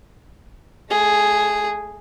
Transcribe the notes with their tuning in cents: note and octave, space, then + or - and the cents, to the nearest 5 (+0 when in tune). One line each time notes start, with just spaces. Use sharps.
A3 -25 G#4 +0